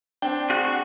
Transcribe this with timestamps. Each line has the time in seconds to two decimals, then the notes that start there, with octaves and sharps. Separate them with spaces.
0.22 C4 D4 G5
0.50 F#4 G#4 F#6